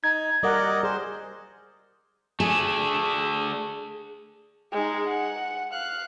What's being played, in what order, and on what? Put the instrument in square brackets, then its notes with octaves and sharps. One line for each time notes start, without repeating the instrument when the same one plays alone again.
[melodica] D#4 [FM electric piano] G#6
[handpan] G3 A#4 F#5 [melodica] D5 D#5
[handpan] G#4 [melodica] C5
[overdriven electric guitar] A3 D4 [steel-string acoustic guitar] G#4
[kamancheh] G#3 D#4
F#5
F5 F#6